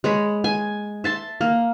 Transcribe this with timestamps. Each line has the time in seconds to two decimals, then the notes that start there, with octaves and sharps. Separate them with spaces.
0.04 G#3 C#5 B5
0.44 G#5
1.04 E5 A5 C6
1.41 A#3